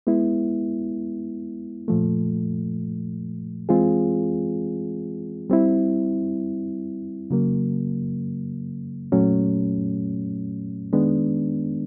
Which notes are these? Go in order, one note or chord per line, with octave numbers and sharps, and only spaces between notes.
G#3 B3 E4
A#2 F3 A3
E3 G#3 C4 F4 G#4
G3 C4 E4
C#3 F#3 A#3
A#2 F#3 A3 C#4
D#3 G#3 B3 D4